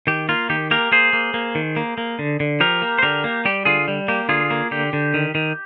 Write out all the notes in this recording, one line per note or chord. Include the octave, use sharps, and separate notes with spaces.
D#3 G4
A#3 F4
D#3 G4
A#3 G4 A#4
A#3 G#4 C5
A#3
A#3
D#3
A#3
A#3
D3
D3
F3 G4 A#4
A#3
C5
D3 G4 A#4
A#3
G3 G4
D3 F4 G#4
G3
A#3 G4
D3 F4 G#4
A#3
D3 G4
D3
D#3
D#3